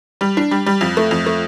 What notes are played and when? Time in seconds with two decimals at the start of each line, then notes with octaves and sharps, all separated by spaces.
0.21 G3
0.37 D4
0.51 G3
0.66 G3
0.81 F2
0.97 A3
1.11 F2
1.26 A3